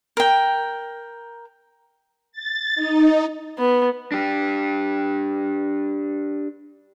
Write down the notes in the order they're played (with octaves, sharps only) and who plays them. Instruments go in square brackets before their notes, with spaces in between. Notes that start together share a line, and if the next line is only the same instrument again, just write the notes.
[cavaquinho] A#4 G5
[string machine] A6
D#4
[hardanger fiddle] B3
[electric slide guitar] D4 G4